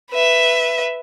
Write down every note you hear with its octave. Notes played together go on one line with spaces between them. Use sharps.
B4 E5